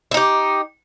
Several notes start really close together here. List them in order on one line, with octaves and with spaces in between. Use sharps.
E4 D#4 G4